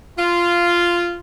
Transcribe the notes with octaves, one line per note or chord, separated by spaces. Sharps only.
F4